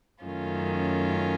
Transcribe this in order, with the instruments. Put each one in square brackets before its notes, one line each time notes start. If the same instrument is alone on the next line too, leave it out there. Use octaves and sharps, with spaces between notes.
[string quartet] F#2 D#3 A3 C#4 F4